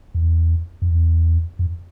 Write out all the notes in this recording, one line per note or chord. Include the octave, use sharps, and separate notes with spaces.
E2
F2
E2
F2